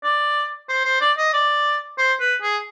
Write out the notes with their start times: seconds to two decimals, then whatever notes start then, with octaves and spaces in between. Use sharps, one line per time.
0.04 D5
0.69 C5
0.85 C5
1.01 D5
1.18 D#5
1.33 D5
1.98 C5
2.20 B4
2.42 G#4